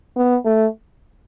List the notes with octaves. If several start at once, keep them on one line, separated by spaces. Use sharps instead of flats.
B3
A3